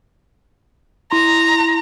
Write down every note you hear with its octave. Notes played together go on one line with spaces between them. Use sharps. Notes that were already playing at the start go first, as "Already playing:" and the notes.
E4 A#5 C6